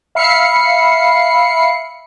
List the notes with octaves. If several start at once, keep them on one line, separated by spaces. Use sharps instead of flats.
E5 F5 B5 C7 C#7